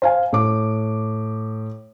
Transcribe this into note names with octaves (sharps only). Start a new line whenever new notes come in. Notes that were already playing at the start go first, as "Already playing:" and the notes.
C5 F5 G#5
A2 D6